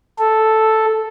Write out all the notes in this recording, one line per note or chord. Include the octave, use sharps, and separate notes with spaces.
A4